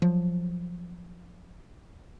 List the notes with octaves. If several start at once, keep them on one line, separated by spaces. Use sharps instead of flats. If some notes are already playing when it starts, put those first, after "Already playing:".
F3 F#3